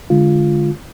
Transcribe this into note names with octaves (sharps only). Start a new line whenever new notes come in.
D3 G#3 F4